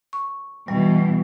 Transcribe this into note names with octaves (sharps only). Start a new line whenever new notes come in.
C#6
B2 E3 G3